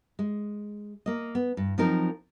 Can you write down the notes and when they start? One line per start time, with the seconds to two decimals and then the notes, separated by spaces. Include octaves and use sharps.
0.19 G#3
1.06 A#3 D#5
1.35 B3
1.57 G2
1.78 F3 F#3 C4 D#4 A#4